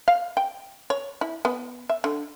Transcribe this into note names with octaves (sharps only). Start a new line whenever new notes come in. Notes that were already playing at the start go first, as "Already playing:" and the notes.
F5
G5
C#5
E4
B3
E5
D3